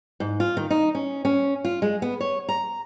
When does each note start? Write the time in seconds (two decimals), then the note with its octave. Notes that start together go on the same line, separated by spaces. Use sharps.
0.20 G#2
0.40 F4
0.57 D#3
0.71 D#4
0.95 C#4
1.25 C#4
1.65 F4
1.82 G#3
2.02 B3
2.21 C#5
2.49 A#5